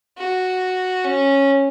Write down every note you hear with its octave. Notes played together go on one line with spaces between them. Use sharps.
F#4
C#4